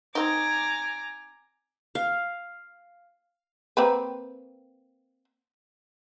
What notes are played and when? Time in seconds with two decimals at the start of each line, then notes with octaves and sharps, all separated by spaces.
0.15 C4 D#4 G#5 A#5 D6
1.95 F5
3.77 A#3 C4 B4